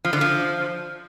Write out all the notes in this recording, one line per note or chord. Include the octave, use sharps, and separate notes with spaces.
F3
D3
F3